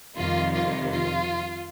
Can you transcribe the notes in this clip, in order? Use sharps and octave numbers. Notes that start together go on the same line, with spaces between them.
F2 C3 D#3 G3 F4
F4
F4